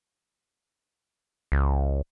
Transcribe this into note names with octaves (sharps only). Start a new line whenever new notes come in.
C#2